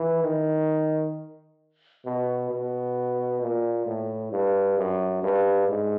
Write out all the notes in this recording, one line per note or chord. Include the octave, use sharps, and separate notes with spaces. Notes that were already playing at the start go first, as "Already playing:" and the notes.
Already playing: E3
D#3
B2
B2
A#2
A2
G2
F#2
G2
G#2